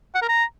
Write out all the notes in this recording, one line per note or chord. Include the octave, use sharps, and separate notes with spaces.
F#5
A#4
A#5